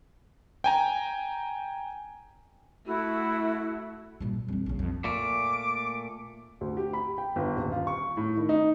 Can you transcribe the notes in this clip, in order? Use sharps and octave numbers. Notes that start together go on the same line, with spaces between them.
G5 G#5 A#5
A3 E4 F#4
A#2 G3
F2 G3
A#1 C#3
F2
A#2 A3 D6
D2
G4
B5
G5
G1
D#1
F4
C#6
A2
D#3
D#4